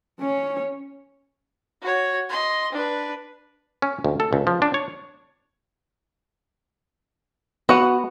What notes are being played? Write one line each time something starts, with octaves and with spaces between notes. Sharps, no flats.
C#4 C#5
F#4 C#5
D#5 C6
D4 B4
C#4
D2
A4
C#2
F3
D4
C#5
B3 F#4 F#5